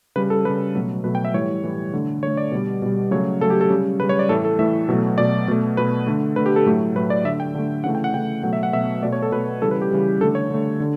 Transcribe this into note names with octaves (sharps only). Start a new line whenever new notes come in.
C#3 G3 B4
A4
C#3 G3 B4
B2 F#3 A3
B2 F#3 A3 B4
G5
E5
A2 E3 G3 C#5
A2 E3 G3
D3 A3
D3 A3 C#5
D5
B2 G3
B2 G3
C#3 F#3 A3 C#5
C#3 F#3 A3 A4
G4
A4
C#3 G3
C#3 G3 B4
C#5
D5
A2 E3 A3 A4
A4
A2 E3 A3 E5
B2 F#3 A3
B2 F#3 A3 D5
B2 A3
B2 A3 B4
D3 A3
D3 A3 B4
G4
A4
A2 F#3 A3
A2 F#3 A3 B4
D5
D3 A3 E5
G5
D3 A3
C#3 E3 A3 F#5
G5
F#5
C#3 E3 A3 G5
B2 F#3 A3 F#5
E5
F#5
B2 F#3 A3 E5
B2 A3 D5
C#5
A4
B2 A3 B4
C#3 E3 G3 A4
B4
G4
C#3 E3 G3
D3 A3 A4
C#5
D3 A3
D3